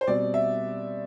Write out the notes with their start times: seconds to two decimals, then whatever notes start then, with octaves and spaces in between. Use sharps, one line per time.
0.01 C5
0.07 B2 G3 C4 D5
0.34 E5